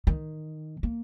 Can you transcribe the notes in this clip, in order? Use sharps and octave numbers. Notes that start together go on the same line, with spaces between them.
D#3
A#3